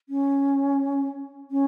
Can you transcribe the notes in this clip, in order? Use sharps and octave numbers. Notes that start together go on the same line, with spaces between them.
C#4
C#4